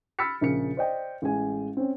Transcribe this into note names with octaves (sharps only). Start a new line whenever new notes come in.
B5 E6 F6 A6 B6 C#7
A#1 C#3 A#4 C#7
C5 D5 D#5 G5
A1 G#3 G#5
C4 C#4